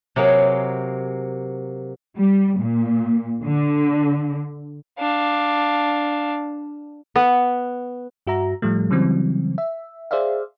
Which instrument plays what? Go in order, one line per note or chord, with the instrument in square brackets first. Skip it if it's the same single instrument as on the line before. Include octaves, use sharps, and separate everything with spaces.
[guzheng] C3 F#3 A#3 G#4
[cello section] G3
A#2
D3
[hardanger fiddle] D4 F5
[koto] B3
[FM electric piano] G2 F#4 E5 A#5
A2 F3 G3 A3
C#3 E3 F#3 G3 C4
E5
G#4 C5 D5 E5 F5